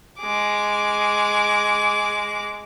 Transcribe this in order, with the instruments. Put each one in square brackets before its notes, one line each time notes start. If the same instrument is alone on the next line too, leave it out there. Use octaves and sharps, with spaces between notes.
[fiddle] G#3 D6